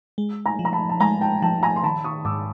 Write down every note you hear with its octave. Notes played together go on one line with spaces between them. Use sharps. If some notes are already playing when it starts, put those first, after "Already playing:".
G#3
G#5 A#5
F3
A#5
A5 B5
A5
G#3 G#5 A#5
G5 A5
F3 G5 A5
G#5 A#5
C6
D#3 A5 B5
C#6 D#6
G#2 D6 E6